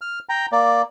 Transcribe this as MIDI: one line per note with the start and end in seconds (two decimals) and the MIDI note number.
0.01 0.19 89
0.29 0.46 79
0.29 0.46 82
0.52 0.82 58
0.52 0.82 74